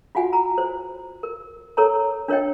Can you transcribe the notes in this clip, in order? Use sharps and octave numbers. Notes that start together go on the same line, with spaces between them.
F4 F#4 F#5 G#5
A#5
C5
A#4
A4 A#4 C#5 A#5
D4 A#4 C#5 D#5 G5